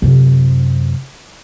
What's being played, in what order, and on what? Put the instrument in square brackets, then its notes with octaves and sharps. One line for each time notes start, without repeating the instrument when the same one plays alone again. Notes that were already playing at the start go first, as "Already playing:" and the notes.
[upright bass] F#2 C3